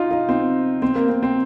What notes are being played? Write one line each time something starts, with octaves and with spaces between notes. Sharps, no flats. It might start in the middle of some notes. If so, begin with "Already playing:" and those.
Already playing: D#4 F4
D#4
C4
C4
A#3
C4
C4